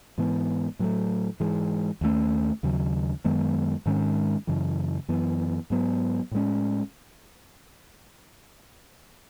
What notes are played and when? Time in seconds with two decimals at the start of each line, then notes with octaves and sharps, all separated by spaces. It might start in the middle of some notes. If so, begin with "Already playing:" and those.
0.18 G#2 E3 B3
0.79 A2 F#3 A3
1.40 G#2 E3 G#3
2.01 D#2 D#3 A3 C#4
2.63 D#2 C#3 F#3
3.25 F#2 D#3 G#3 B3
3.86 G#2 D#3 G#3 C#4
4.47 F#2 C#3 E3
5.09 F#2 E3 B3
5.70 G#2 F#3 B3
6.31 A2 G#3 C#4